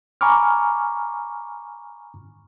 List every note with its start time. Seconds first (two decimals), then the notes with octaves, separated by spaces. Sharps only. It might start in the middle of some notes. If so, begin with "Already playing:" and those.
0.21 G#5 A#5 B5 C#6 D6 F6